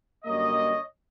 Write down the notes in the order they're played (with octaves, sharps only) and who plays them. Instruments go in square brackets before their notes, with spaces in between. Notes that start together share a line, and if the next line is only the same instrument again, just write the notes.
[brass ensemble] F#2 D3 G3 A#3 C#5 D#5